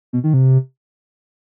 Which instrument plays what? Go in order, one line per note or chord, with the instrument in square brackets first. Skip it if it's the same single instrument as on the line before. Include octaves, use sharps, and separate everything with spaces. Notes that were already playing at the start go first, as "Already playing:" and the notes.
[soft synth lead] B2
D#3
C3